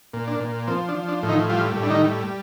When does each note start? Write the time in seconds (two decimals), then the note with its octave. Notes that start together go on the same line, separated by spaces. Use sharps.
0.13 A#2
0.28 D4
0.40 A#2
0.67 F3 C4
0.88 D4
0.95 F3
1.08 D4
1.23 A2
1.29 D#3 D#4
1.49 F3 G3 F4
1.76 A2
1.83 D4
1.90 D#3 D#4
2.04 G3